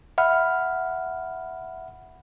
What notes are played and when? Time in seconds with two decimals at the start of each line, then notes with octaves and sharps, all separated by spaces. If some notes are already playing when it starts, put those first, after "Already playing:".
0.18 E5 F#5 B5 F6